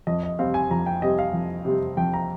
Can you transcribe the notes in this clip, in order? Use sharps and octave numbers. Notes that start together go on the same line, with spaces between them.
F2 D#5
D#5
C3 G3 C4 F5
G#5
F2 A#5
G5
C3 G3 C4 D#5
F5
F2
C3 G3 C4
F2 G5
A#5